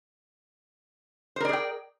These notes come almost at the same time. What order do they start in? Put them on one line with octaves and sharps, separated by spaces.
C5 A#4 D5 G#4 G5